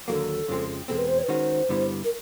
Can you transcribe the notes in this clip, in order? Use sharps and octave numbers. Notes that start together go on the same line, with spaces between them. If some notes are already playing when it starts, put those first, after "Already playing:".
D#2 D3 F#3 A#3 A4
F2 C#3 F3 G#3 C4
E2 B2 G#3 C4 A4
B4
C5
C#5
B4
D#3 G#3 C#4 F#4 C5
G2 D3 G3 B3 E4
A#4